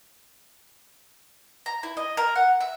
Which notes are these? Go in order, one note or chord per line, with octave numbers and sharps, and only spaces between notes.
A#5
E4
D#5
A#4
F#5
E5